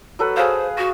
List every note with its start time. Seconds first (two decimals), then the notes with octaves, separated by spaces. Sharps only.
0.19 F#3 A4 B4
0.36 G#4 C5 F5
0.78 F#4